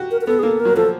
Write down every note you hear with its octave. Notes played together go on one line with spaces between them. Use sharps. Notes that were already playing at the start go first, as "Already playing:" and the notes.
Already playing: F#4 G4
A#4
A#4
B3 A4
G#4
A#3 A4
A#4
F#3
F3 A4